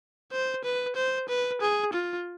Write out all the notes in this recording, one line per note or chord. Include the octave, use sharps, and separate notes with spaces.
C5
B4
C5
B4
G#4
F4